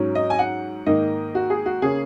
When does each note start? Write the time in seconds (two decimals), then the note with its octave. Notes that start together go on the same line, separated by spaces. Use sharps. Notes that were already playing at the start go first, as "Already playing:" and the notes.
Already playing: G#2 F#3 C#4
0.15 D#5
0.30 G#5
0.39 F#5
0.86 G#2 D#3 A#3 D#5
1.35 F#4
1.50 G#4
1.66 F#4
1.82 C#3 A#3 C#4 G#4